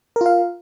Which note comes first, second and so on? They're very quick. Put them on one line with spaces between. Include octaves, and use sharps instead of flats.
A#4 F4 F5